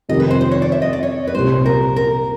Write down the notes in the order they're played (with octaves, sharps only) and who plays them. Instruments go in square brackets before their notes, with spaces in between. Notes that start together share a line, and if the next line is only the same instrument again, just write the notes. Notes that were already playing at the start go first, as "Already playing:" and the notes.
[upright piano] F2 C3 D#3 G3 [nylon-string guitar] D#5
[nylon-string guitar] B4
C5
C5
C#5
D5
E5
D#5
D5
C#5
B4
[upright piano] C2 A#2 G3 [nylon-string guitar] C5
[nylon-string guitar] A#4
A#4